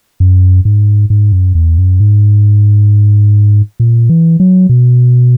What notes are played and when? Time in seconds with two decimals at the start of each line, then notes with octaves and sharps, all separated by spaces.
0.20 F#2
0.65 G#2
1.10 G#2
1.32 F#2
1.55 E2
1.78 F#2
2.00 G#2
3.80 A#2
4.10 E3
4.40 F#3
4.69 B2